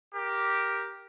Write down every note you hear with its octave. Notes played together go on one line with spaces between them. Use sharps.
G4 A#4